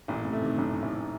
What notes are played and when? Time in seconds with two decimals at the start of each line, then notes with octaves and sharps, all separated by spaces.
0.08 A1 A#2 C#3
0.25 A2 C3
0.33 A3
0.41 C3 D#3
0.58 A1 F#2
0.82 A1